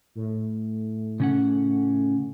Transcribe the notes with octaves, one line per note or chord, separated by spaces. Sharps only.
A2
C#3 C#4 F#5